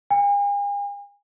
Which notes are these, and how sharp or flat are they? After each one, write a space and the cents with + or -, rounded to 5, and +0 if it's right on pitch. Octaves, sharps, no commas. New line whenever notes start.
G#5 -45